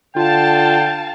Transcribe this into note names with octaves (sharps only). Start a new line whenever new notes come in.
D3 F4 F5 G5 A5